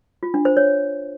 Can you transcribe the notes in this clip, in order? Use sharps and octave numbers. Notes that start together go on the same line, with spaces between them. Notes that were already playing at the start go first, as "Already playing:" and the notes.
F4
D4
C5
C#5